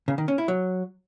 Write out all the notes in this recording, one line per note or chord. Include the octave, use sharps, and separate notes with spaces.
C#3
D#3
C#4
E4
F#3